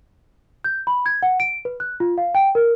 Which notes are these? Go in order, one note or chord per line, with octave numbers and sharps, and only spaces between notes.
G6
B5
G#6
F#5
D7
B4
F#6
F4
F5
G5
A#4